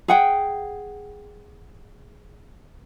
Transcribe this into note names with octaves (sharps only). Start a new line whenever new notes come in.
G#4 F#5 G5